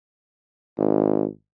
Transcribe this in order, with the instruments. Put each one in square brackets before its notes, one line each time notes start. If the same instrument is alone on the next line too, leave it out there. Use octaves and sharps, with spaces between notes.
[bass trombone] G#1